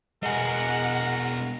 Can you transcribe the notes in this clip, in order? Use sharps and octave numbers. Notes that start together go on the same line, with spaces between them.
B2 G#3 A#4 D#5 F#5 G#5